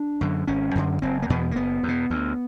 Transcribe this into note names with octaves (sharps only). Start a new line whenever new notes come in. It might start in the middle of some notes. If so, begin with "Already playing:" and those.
Already playing: D4
F#2 D3
G#1 C#4
F#2 D3
F#1 C4
A#3
E2 B2 B3
A#3
F#1 B3
E2
B2
D2